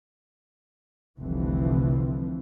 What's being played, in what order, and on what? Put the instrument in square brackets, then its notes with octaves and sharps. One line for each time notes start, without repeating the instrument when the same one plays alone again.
[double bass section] F1 C2 D3 E3 F3 C4